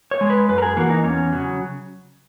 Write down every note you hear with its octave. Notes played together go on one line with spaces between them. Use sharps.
C#5
G#3
B4
F#2 B4
A#4
G#4
E3 A#3 F#4
D#4
E2 C#4
C#3 F#3